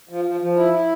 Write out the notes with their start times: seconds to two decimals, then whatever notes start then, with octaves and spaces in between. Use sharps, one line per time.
0.09 F3
0.25 F3
0.41 F3
0.57 E4
0.73 E4